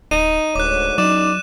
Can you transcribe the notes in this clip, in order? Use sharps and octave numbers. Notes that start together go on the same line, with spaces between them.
D1 D#4 D#7
D1 D2 G#2 C#5 D6 F#6
E2 F#3 C#4 D#4 D5 E7